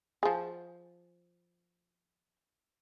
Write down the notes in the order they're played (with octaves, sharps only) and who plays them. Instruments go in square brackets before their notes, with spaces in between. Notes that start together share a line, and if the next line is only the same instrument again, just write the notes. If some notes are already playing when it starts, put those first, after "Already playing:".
[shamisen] F3 G#4